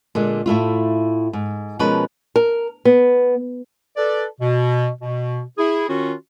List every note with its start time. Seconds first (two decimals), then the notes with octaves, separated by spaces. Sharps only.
0.15 A#2 D3 G#3
0.46 A2 A3 E4 F4
1.33 G#2
1.79 B2 F3 G#3 C#4 A#4 B4
2.36 A#4
2.85 B3
3.97 A4 B4 D5
4.41 B2
5.01 B2
5.58 E4 G#4
5.88 D#3 C#4 F4 F#4